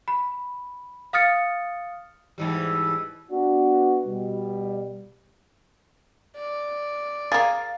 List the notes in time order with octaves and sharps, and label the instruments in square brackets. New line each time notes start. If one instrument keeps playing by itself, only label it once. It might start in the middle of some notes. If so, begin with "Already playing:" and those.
[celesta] B5
F5 D#6 F6 A6 C#7
[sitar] G#2 E3 G3
[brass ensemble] B3 D4 F#4
B2 G3
[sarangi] D5
[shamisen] A#3 G#4 [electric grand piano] F5 A#5 [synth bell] A6